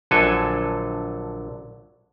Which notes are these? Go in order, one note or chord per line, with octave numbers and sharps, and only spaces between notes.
A#1 D3 F#3 A4 G#5